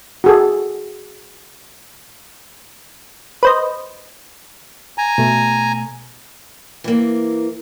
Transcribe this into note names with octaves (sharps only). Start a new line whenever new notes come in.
F#4 G#4 A4
B4 C5 D#5
G#5 A#5
B2 A3
E3 A#3